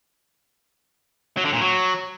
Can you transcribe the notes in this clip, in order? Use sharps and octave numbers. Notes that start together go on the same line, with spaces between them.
F#3
D3
A#2
F#3